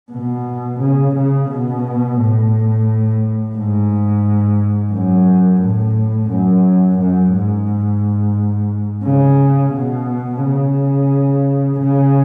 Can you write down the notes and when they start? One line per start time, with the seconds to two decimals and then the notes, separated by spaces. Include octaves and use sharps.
0.12 B2
0.80 C#3
1.15 C#3
1.49 B2
2.18 A2
3.55 G#2
4.92 F#2
5.61 A2
6.29 F#2
6.98 F#2
7.32 G#2
9.04 C#3
9.73 B2
10.42 C#3
11.80 C#3